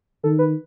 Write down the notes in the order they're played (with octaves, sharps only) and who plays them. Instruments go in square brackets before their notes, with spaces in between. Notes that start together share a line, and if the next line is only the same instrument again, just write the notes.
[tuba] D#3 [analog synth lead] A4
[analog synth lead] B4